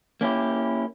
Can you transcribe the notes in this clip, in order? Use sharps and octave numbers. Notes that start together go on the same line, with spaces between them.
A#3 C#4 E4 G4